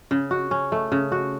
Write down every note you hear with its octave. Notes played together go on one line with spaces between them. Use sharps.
C#3
F#4
C#4
A3
C#3
F#4